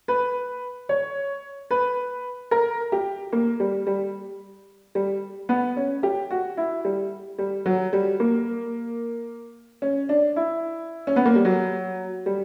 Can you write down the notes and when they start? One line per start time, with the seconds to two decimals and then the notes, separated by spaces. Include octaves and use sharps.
0.08 B4
0.89 C#5
1.71 B4
2.51 A#4
2.92 G4
3.33 A#3
3.60 G3
3.87 G3
4.95 G3
5.49 B3
5.77 C#4
6.03 G4
6.31 F#4
6.57 E4
6.85 G3
7.38 G3
7.66 F#3
7.93 G3
8.20 A#3
9.82 C#4
10.09 D4
10.36 E4
11.07 C#4
11.16 B3
11.26 A#3
11.35 G3
11.45 F#3
12.26 G3